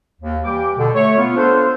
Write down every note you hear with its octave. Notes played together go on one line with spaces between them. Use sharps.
D#2
E3 G3 G4 B4 G5 D6
B2 D3
A3 C#5
B3 F4
B3 D4 F4 A4 C5